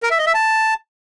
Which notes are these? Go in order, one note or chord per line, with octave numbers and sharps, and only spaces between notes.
A#4
E5
D#5
E5
A5